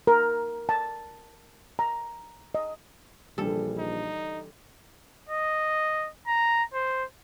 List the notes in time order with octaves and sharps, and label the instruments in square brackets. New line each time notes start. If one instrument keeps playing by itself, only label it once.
[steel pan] A#4
A5
A#5
D#5
[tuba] A#1 [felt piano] D3 E3 G3 [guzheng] A4
[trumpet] D#4
[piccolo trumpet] D#5
A#5
C5